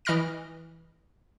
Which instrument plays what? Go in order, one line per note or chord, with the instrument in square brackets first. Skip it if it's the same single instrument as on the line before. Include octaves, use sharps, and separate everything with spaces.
[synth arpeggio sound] E3 D#5 B5 F6 A#6 D7